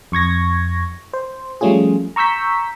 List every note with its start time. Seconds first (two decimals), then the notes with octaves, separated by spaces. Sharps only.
0.12 F2 C#6 G#6 A#6
1.13 C5
1.61 F3 G3 A3 C#4 F4 G#4
2.16 A#5 C#6 E6 G6 B6